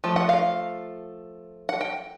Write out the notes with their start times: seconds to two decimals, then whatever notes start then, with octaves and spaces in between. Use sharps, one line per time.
0.04 F3 A3
0.16 F#5
0.29 F5
1.69 F#5
1.81 G5